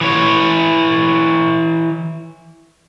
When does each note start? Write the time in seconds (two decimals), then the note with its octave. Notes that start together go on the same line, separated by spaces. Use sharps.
0.01 E3 C#5